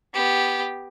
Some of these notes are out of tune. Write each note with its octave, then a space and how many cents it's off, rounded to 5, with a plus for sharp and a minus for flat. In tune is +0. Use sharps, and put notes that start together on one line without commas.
B3 +0 G4 +0